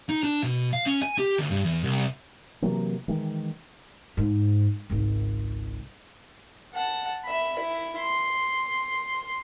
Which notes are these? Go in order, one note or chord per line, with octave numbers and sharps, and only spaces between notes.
D#4
D4
B2
F5
C#4
G#5
G4
D2
G2
E2
C2
C3 E3 F#3 A#3
D#3 E3 G#3
G#2
G#1 C#2
F#5 A5
E5 B5
E4
C6